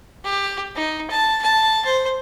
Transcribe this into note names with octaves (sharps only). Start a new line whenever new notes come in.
G4
D#4
A5
A5
C5